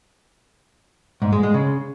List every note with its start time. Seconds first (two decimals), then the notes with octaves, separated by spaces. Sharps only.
1.22 G#2
1.32 G#3
1.43 G#3
1.54 C#3